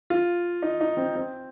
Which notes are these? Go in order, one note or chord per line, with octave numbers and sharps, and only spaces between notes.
F4
D#4
D#4
C4
C4